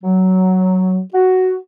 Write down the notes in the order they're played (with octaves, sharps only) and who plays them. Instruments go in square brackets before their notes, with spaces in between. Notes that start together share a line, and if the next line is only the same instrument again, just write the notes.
[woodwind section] F#3
F#4